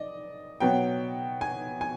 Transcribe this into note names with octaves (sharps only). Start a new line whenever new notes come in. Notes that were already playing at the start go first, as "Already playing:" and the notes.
Already playing: D5 D#5
B2 F#3 B3 G5
G#5
G#5